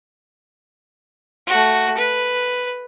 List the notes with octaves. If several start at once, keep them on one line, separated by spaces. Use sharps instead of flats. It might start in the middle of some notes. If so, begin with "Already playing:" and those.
A3 F#4
B4